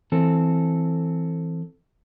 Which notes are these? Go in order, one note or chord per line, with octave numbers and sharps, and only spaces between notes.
E3 C4 A4